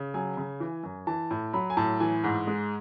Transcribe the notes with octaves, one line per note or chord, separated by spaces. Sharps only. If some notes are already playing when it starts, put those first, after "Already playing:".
Already playing: C#3
F#3 G#5
C#3
E3
F#2
E3 A5
A2
F#3 B5
G#5
A2 A5
E3 G#5
G#2
G#3